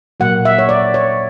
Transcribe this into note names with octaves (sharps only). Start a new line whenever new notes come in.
A#2 F#3 A#3 F#5
E5
C#5
D5
C#5